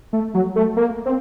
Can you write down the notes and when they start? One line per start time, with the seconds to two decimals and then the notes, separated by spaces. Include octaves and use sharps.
0.13 A3
0.34 F#3
0.56 A3
0.77 A#3
1.06 C4